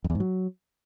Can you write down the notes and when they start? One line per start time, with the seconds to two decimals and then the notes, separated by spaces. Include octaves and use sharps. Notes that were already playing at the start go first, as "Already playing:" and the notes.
0.04 F2
0.10 E2
0.15 G#2
0.20 F#3